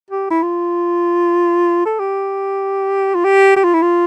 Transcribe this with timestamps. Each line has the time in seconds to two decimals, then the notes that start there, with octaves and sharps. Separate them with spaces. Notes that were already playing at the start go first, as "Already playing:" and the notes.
0.10 G4
0.31 E4
0.42 F4
1.85 A4
1.99 G4
3.15 F4
3.24 G4
3.56 G4
3.64 F4
3.74 E4
3.82 F4